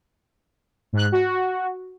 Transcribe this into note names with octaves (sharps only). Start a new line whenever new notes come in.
G#2 F#6
F#4